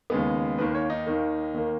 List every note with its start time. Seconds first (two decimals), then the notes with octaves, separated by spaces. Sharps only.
0.10 D#2 C#3 G#3 B3
0.58 D#2 D#3 A#3 B4
0.75 C#5
0.90 D#4
1.07 D#2 D#3 A#3
1.54 D#2 D#3 A#3